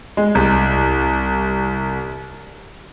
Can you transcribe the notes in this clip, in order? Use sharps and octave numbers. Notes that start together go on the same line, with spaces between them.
G#3
C2